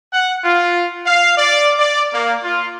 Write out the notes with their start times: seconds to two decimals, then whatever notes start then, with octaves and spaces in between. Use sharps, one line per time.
0.13 F#5
0.44 F4
1.06 F5
1.37 D5
1.78 D5
2.14 A#3
2.43 F4